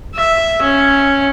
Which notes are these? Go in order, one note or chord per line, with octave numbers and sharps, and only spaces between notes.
E5
C#4